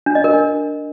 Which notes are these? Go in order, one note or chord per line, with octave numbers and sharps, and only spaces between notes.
D4
D#5
A#4
D4